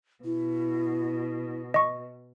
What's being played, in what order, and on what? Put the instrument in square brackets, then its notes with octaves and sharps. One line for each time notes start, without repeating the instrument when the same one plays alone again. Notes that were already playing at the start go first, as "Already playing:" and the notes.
[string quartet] B2 [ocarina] E4
[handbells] D#5 C#6